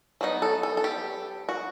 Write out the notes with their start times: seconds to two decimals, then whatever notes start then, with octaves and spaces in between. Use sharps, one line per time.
0.21 F#3 B3 D#4
0.42 A4
0.63 A4
0.77 A4
0.84 G4
1.49 F#4